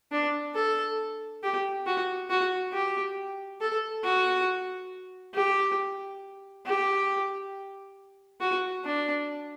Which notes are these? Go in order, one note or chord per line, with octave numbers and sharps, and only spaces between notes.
D4
A4
G4
F#4
F#4
G4
A4
F#4
G4
G4
F#4
D4